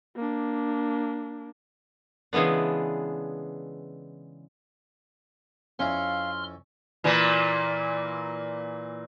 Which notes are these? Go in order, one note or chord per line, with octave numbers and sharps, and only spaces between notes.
A#3 D4
C#3 E3 G#3 B3 D4
F2 C#4 E4 E5 F5 C6 F6
A#2 E3 A#3